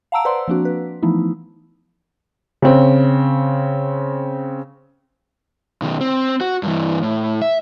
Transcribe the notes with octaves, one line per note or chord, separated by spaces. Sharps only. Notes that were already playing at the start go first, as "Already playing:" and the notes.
F5 F#5 A5 A#5 E6 D7
B4 C5 D5 F#5 A#5 C6
F3 A#3 C4 D4 F#4
B4
E3 F3 A3 B3 D#4 E4
C#3 C4
B2 D#3
C4
F#4
G2 E3
A2
E5